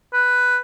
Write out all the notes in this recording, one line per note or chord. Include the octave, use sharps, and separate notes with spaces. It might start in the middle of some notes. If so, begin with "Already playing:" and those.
B4